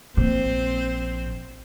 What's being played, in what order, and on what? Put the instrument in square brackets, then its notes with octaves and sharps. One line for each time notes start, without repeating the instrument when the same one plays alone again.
[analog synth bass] A#1 [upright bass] A#2 [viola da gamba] C4 C5